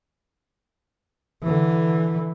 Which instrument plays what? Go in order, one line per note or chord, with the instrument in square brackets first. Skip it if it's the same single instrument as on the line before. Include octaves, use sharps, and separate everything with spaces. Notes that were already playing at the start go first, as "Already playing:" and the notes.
[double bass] D3 E3